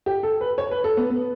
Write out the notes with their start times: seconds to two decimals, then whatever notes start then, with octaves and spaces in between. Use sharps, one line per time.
0.06 G4
0.23 A4
0.41 B4
0.58 C#5
0.71 B4
0.84 A4
0.97 B3
1.10 B3